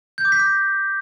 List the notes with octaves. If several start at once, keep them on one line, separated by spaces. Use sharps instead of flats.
G6
D6
B6
D6
A#6